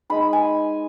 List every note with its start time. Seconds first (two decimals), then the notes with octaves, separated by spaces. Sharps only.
0.10 G#3 D#4 B5
0.33 G#5